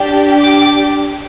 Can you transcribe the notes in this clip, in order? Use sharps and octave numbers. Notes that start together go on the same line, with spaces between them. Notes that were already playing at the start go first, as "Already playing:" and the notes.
Already playing: D4 G4
D6